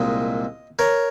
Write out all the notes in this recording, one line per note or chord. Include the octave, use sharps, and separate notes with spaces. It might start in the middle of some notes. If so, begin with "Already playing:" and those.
Already playing: C2 A#2 G#3 D#5
A#4 C#5